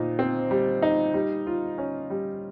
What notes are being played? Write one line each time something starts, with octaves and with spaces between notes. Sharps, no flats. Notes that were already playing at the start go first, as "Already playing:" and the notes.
Already playing: A#2 C4 D#4
C4
G3
D#4
G3
F4
C#4
G3